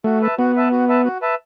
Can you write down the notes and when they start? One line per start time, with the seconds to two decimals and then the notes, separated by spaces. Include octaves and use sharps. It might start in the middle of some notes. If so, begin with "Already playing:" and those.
0.04 A3 F#4
0.21 B4 E5 A5
0.38 B3 F#4
0.55 B4 E5 A5
0.72 F#4
0.89 B4 E5 A5
1.04 F#4
1.22 B4 E5 A5